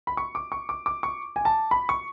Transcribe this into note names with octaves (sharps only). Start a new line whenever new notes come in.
B5
C#6
D6
C#6
D6
D6
C#6
G#5
A5
B5
C#6